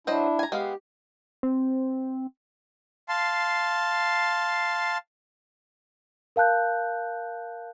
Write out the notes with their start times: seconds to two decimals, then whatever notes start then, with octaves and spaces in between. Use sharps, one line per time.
0.07 F#3 D4 E4 C5 D#5
0.39 G#5 A#5
0.52 G#3 B3 G4 F5
1.43 C4
3.09 F5 A5 C6
6.36 A#4 F5 A5 F#6 G6